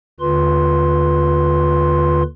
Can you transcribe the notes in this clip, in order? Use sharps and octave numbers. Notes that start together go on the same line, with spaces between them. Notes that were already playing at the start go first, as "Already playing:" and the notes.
D#2 D3 F4 B4 C6